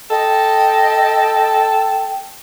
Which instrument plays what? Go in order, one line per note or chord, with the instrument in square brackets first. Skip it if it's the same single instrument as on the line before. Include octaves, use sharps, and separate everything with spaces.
[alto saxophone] A4 [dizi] D#5 [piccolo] G5